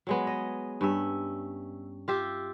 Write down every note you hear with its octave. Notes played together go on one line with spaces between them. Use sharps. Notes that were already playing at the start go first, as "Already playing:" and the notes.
F#3 G#3 B3
D#5
G2 C#4 E5
F4 G4 E5